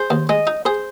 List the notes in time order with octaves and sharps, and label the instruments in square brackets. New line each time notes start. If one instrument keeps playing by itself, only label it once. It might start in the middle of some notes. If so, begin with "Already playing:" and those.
Already playing: [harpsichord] G#4 [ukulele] C5
[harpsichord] D#2
[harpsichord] G#3 [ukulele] D#5
[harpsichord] D#4
[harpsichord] G#4 [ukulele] C5